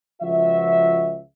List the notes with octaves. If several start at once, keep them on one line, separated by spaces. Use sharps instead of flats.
C#2 F3 F#4 E5